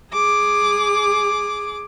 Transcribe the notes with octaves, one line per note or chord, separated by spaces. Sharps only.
G#4 D6